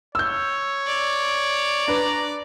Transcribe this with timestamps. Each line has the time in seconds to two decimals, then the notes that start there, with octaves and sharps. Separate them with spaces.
0.15 C#5 E6 G6
0.87 D5
1.88 D4 B4 A#5